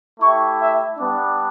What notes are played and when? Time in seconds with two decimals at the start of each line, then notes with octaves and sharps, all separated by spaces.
0.20 A3 E4 G4 C#6
0.59 E5
0.97 G3 B3 D4